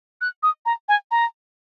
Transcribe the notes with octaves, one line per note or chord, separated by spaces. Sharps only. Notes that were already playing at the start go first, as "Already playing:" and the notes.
F#6
D#6
A#5
G#5
A#5